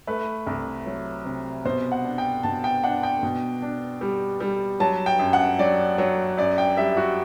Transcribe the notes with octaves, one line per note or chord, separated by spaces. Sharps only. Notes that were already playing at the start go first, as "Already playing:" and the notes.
A3 B4
C2
F#3
C3
B2 C5
F#5
D4
G5
B2 A5
G5
D4 F#5
G5
B2
D4
G3
G3
F#3 A5
G5
F#2
F#5
F#3 D5
F#3
F#2 D5
G5
G3 E5
F#4